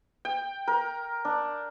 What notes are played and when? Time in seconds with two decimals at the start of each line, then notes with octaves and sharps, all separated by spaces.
0.25 G5
0.67 A#4
1.25 D4